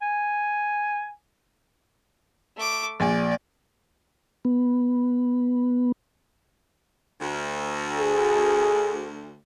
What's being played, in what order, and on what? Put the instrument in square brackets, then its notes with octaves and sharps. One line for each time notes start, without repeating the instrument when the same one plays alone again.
[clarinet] G#5
[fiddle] A3 D6
[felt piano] A#1 G#5 [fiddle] D5
[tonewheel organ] B3
[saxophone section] D2
[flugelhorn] G#4